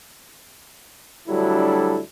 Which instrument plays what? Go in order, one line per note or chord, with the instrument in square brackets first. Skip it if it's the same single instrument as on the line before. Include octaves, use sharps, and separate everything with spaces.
[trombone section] D2 F#3 G3 D4 E4 A4